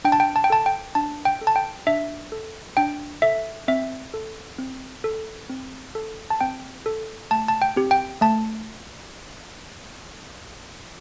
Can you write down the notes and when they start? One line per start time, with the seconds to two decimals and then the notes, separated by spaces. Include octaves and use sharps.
0.05 D4 G5
0.12 A5
0.20 G5
0.36 A5
0.44 G5
0.50 A4 A5
0.66 G5
0.95 D4 A5
1.25 G5
1.41 A4
1.47 A5
1.56 G5
1.87 D4 E5
2.32 A4
2.77 D4 G5
3.22 A4 E5
3.68 C4 E5
4.14 A4
4.58 C4
5.04 A4
5.50 C4
5.95 A4
6.30 A5
6.41 C4 G5
6.86 A4
7.31 A3 A5
7.48 A5
7.62 G5
7.76 C4 G4
7.91 G5
8.21 A3 A5